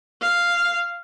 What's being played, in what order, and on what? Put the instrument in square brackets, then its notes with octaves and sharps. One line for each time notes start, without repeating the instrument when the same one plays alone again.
[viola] F5